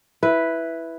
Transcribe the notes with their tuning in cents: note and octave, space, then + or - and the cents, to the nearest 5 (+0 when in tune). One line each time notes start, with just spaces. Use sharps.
E4 +0 B4 +0